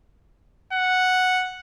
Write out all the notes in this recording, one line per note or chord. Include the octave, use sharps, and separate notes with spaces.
F#5